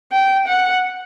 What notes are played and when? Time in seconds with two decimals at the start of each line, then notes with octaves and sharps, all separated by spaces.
0.12 G5
0.47 F#5